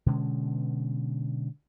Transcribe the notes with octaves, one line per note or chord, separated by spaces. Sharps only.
B2 D3 G#3 C#4